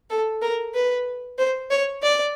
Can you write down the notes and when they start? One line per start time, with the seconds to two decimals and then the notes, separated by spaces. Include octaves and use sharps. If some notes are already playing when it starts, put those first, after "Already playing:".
0.10 A4
0.42 A#4
0.74 B4
1.38 C5
1.70 C#5
2.02 D5